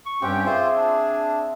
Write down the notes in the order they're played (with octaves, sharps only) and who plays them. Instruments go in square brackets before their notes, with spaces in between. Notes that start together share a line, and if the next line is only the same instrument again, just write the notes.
[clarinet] C#6
[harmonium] G2 C#4 G4 [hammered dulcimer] C4 F#5
[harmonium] F4 C5 [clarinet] G#4 [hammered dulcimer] D5 E5 C6
[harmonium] D4